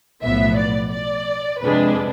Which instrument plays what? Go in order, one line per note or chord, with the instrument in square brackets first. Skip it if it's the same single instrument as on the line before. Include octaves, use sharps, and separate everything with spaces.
[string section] B1 A2 F3 B3 E5
D5
D5
F2 C3 G#3 D4 B4